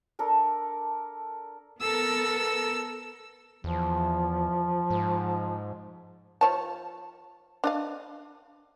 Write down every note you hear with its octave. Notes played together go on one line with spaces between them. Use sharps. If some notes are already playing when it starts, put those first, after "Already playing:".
D4 A4 A#4
B3 A4 A#4 E6
E2 F3
G#2
F3 C#5 A5
D4 D#5 F5